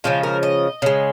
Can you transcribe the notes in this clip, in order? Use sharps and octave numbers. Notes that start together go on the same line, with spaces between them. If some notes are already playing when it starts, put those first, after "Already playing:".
C#3 F3 G#3 F4
A#4
D#5
C#3 G#3